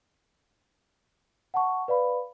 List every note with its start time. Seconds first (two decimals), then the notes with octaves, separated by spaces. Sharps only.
1.54 F#5 A5 C#6
1.88 B4 D5 F5 B5